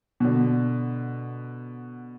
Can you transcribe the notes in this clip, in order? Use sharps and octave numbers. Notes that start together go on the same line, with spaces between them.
B2 D3